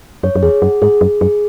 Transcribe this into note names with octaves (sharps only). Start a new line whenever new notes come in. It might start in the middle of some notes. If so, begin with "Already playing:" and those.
F#2 C#5
F#2
E2 G#4
F#2 F#5
G#2 G#4
F#2 G#4
F#2 G#4